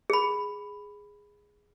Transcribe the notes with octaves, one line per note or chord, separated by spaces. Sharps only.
G#4 B5